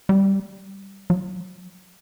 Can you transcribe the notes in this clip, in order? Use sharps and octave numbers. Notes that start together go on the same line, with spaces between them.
G3
F#3